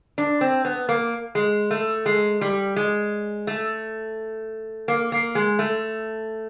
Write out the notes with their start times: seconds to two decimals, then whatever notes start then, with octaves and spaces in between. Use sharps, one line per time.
0.18 D4
0.41 C4
0.65 B3
0.89 A#3
1.35 G#3
1.71 A3
2.06 G#3
2.41 G3
2.76 G#3
3.47 A3
4.88 A#3
5.12 A#3
5.35 G#3
5.59 A3